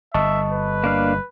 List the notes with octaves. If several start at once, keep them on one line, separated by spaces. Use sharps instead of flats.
G1 D#5 E5 A5 C#6
B4
A#3 D4 F5